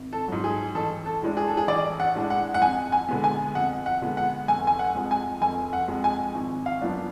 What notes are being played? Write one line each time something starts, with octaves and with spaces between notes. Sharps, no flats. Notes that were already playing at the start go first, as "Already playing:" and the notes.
Already playing: G#1
A4
G#2 F#3
G#4
A1 A4
A4
A2 G#3 D4
G#4
A4
G#4
A1 D5
F#5
A2 G#3 D4
F#5
F#5
F2 G#5
G#5
D3 G#3 B3
G#5
F2 F#5
F#5
D3 G#3 B3
F#5
F1 G#5
G#5
F#5
F2 F3 G#3
G#5
F1 G#5
F#5
F2 F3 G#3
G#5
G#1
F5
F#2 F3 B3 D4